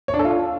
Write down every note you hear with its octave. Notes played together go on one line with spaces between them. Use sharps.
C#5
D4
A4
F4